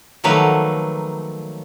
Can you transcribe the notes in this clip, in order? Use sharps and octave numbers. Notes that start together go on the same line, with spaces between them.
D#3 F3 F#3 A3 A#3 B4